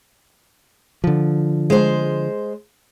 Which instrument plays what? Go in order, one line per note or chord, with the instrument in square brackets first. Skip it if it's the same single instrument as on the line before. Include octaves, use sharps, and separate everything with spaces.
[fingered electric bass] D3 F3
[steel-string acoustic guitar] G#3 C5